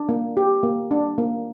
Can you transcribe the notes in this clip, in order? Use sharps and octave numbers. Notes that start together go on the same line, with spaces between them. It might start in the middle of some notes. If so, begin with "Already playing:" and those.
Already playing: D4
A#3
G4
A#3
D4
A#3